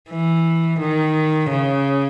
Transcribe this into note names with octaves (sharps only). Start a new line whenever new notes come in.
E3
D#3
C#3